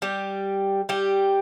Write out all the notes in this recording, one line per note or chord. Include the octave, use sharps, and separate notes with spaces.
G3 G4
G3 G4